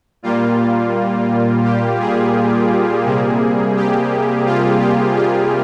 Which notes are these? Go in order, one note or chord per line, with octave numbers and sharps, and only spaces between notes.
A#2 G3 A#3 F4
G4
G#4
C3 G3 A#3
G4
F4
G4
F4